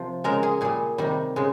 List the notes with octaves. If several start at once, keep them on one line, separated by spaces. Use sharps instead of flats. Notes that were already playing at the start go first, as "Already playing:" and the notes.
Already playing: C3 F3
C#3 G#3 A#4
G#4
A#2 G3 G#4
C3 D#3 G3
C#3 G#3